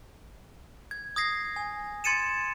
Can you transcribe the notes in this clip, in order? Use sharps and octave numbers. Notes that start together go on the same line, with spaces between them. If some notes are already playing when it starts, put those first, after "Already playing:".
G#6
D#6 G#6 A#6 C7
G#5
C6 G#6 A6 C#7 D#7 E7